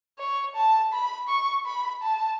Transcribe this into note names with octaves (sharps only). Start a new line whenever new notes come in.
C#5
A5
B5
C#6
B5
A5